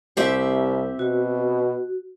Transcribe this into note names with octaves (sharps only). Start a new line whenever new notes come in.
C2 C4 G4 E5
B2 F#4